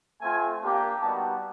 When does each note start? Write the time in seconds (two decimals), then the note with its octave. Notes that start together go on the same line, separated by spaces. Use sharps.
0.21 A3 C4 F4 G#5
0.62 A#3 D4 G4
1.02 G3 B3 D#4 F#4 A5